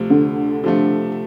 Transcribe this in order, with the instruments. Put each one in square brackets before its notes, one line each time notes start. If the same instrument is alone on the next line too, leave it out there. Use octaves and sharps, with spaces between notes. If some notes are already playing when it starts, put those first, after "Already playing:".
Already playing: [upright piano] D2 C3 F3
[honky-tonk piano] D3
[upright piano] C3 F3 A3